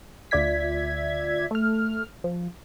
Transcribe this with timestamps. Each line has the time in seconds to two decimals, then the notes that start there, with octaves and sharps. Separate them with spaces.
0.31 D2 F4 D5 E5 G#6 B6
1.51 A3 F6
2.24 F3